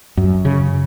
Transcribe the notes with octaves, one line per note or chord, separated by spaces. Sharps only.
F#2
C#3